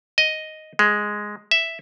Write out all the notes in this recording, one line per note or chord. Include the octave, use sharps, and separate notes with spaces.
D#5
G#3
E5